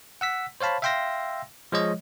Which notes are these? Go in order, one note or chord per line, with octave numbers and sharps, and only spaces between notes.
F#5 E6 B6
C5 C#5 F5 A5 B5
E5 F5 G5 C6 E6 A#6
F3 G#3 C#5 D#5